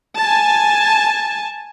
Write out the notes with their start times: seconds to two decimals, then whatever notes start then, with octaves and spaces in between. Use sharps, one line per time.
0.19 G#5 A5